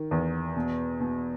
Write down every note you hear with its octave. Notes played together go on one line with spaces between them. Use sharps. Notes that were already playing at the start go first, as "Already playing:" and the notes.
Already playing: D#3
E2
B2
B2